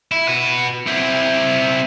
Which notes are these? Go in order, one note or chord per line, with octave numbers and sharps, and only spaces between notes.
E4
F#4 B4
C4 E4